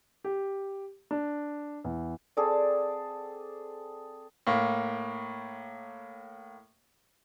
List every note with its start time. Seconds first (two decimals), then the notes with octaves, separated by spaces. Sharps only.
0.24 G4
1.11 D4
1.84 E2
2.37 C4 G#4 A4 D5
4.47 A2 A#3